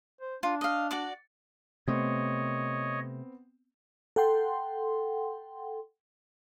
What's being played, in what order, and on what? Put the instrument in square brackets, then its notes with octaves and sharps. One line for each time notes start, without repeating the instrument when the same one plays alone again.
[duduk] C5
[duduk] D4 [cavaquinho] F4
[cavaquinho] D#5 F5
F#4 D5 D6
[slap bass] C3 A3 [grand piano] B3 C4 [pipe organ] C#5 D#5
[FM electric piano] A4 F#5 G5 C6